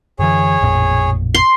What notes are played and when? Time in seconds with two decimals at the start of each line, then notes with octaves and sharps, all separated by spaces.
0.19 F#2 D3 E3 G#4 C#5
0.61 A1 F2 A#2
1.35 C6